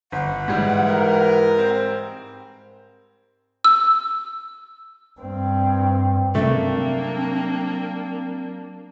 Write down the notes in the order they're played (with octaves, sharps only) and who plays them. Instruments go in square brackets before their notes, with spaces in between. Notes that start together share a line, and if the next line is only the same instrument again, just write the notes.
[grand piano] G1 [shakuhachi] F#5
[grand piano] G#2 G3 [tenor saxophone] E3
[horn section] A#4
[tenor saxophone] C4
[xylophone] E6
[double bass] G2 C4
[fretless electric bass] C3 G3 [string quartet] F#3 A#3 D4 [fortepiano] A3 [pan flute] C4